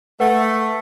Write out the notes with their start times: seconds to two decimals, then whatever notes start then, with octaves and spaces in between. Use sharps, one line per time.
0.20 A3 B4 F#5